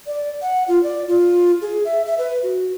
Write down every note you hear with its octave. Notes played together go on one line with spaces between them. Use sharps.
D5
F#5
F4
D5
F4
G#4
E5
E5
B4
F#4